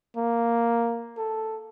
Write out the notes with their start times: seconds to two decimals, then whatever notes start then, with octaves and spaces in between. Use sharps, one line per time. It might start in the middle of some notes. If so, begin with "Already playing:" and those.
0.17 A#3
1.18 A4